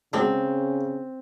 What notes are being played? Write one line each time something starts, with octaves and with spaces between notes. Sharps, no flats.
C#3 F#3 G#3 C4 D4